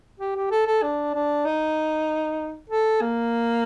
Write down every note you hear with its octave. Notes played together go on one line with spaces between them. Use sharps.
G4
G4
A4
A4
D4
D4
D#4
A4
A#3